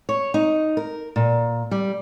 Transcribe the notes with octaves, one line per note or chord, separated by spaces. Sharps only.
C#5
D#4
A#4
A#2
G3